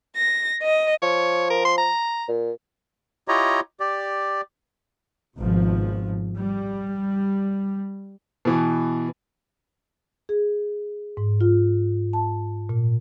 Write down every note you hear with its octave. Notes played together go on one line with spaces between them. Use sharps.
A#6
D#5
F3 C#5
A#4
C6
A#5
A#2
E4 F4 G4 C#5 D#5 A#5
G4 D5
G#1 B2 F3
G3
B2 E3
G#4
G#2
F4
A5
A#2